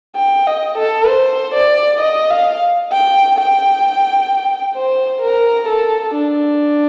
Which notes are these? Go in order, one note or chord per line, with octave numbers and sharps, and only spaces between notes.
G5
D#5
A4
C5
D5
D#5
F5
G5
G5
C5
A#4
A4
D4